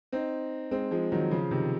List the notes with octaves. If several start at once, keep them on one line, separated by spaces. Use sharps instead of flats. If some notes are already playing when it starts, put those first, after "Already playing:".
C4 D#4
G#3 C4
F3 G#3
D#3 F#3
C#3 F3
C3 D#3